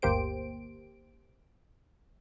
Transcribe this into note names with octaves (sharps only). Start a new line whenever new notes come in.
G1 D2 A#3 G4 C5 D7